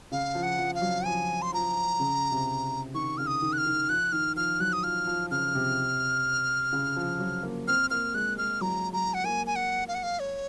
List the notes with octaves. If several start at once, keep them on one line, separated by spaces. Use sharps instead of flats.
C#3 F5
F3
F#5
F3
F5
F#3
F3 G#5
C6
F3 A#5
C#3
C3
D#3 C#6
C#3 F6
D#6
D#3
F#6
F6
D#3
F3 F#6
D#3 F6
F3 F6
F#3 F#6
D#6
F3 F6
F3
C#3 F6
C3
C#3
F3
F#3
A#3
C4 F6
A#3 F6
G#3 F#6
G#3 F6
F#3 A#5
F#3 A#5
F#5
A#3 G#5
G#5
F#5
F5
F#5
F5
C#5